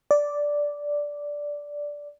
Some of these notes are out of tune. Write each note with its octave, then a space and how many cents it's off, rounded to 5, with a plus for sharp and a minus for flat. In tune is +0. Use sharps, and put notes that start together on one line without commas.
D5 -5